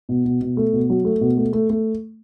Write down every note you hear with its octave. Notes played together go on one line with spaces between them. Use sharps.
B2
B2
B2
A3
B2
F#3
A3
B2
A3
A3
A3